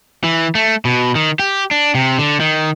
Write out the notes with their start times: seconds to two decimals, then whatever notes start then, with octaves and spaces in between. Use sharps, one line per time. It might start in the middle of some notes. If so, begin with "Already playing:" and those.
0.24 E3
0.55 A3
0.85 B2
1.15 D#3
1.39 G4
1.71 D4
1.95 C3
2.19 D3
2.40 D#3